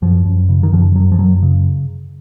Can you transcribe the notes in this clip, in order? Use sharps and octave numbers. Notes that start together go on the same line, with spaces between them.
F#2 F3
F#2
C#3
D#3
F#2 F3
F#2 F#3
F3
F#2 F#3
C#3